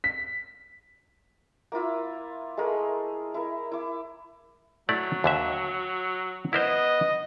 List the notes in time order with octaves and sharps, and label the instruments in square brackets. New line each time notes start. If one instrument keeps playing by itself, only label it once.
[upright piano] B6
[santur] A#3 E4 F4 E5
G#3 A3 G#4 A#4
E4 A#4
E4 D6
[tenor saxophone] F#3 [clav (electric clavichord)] A3 E4 D5
[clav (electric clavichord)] D#2 D3 E5
[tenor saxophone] B3 [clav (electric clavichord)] E4 A#4 C5 [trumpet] D#5